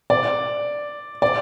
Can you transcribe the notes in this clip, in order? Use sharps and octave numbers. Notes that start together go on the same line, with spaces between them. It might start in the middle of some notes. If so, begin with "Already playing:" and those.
D5
D5